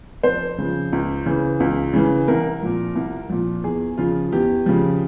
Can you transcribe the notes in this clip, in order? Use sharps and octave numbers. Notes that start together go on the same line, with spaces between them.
F2 C5
C#3 F3
C#2
C#3 E3
C#2
C#3 E3
C2 A#4
A#2 F3
C2
A#2 F3
E2 G#4
C#3 F3 F4
E2 G4
C#3 F3